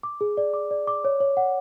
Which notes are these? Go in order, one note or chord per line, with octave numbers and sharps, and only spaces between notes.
D6
G#4
D5
D6
D5
D6
C#5
C#5
F#5